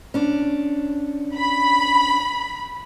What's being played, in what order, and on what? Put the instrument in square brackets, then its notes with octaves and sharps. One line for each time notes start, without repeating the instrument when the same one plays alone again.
[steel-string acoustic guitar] C#4 D4
[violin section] B5